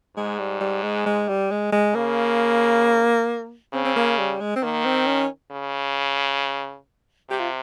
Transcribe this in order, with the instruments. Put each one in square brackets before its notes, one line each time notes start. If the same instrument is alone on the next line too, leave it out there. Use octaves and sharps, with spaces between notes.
[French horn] G#2 [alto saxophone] G#3
[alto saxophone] G3
G3
G#3
G#3
G3
G#3
G#3
[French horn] C#3 [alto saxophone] A#3
[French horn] C#3 [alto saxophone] C4
[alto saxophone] C4
A#3
G3
G#3
C4
[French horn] D#3 [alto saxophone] A#3
[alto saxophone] C4
C#4
[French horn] C#3
[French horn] C3 [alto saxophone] G4
[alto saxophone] F4